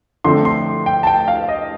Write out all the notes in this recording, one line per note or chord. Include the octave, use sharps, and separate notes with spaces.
D3 F3 A3 C4 C6
C6
G5
A5
G5
F5
D#5